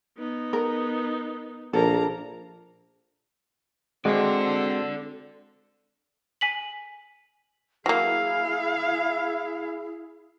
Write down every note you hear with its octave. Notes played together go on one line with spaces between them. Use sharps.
B3 D#4
A#4
A#1 A#3 A4 A#5
G#3 C4 F#4 A4 D5
G#5 B6 F#7
F#3 A#3 E4 G#4 F5